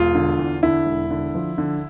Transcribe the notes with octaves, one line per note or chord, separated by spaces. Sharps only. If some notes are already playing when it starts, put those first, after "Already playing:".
Already playing: E1 F4
D3
E2
D3 E4
E1
D3
F3
D3